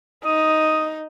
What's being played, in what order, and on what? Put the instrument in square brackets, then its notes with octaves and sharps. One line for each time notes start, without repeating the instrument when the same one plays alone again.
[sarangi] D#4 [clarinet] D#6